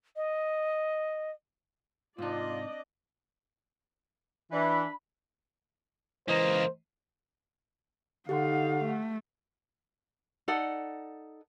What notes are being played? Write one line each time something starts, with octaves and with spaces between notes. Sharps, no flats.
D#5
G#2 C3 C4 D4 D#4 F4 D5 D#5
E3 D4 B5
C#2 E3 A#3 C5 D#5 A#5
D3 D#4 G4 F5 F#5 C6
A3
D#4 A4 D5 F#5